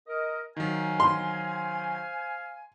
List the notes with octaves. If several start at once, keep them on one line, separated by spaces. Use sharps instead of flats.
A#4 D#5
D#3 F#3 C5 F5 G#5
C6